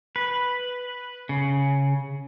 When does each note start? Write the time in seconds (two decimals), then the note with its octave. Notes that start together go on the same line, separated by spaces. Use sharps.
0.16 B4
1.29 C#3